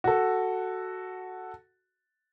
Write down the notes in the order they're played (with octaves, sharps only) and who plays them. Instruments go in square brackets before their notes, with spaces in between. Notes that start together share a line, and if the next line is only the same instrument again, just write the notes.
[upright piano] F#4 A4